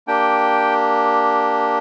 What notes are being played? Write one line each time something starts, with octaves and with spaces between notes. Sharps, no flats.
A#3 D4 G4 G5